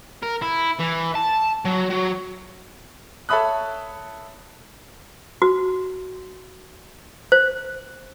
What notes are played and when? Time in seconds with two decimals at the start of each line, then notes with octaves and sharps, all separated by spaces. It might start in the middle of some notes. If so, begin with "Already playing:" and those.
0.23 A#4
0.42 E4
0.79 E3
1.15 A5
1.65 F#3
1.90 F#3
3.29 A4 C#5 E5 B5 D#6 F#6
5.42 F#4
7.32 C5